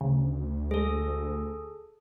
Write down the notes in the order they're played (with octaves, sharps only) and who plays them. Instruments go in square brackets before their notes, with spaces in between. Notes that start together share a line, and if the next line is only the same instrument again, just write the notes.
[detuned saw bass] D2 [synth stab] C#3
[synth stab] G#3 [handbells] G#4 A4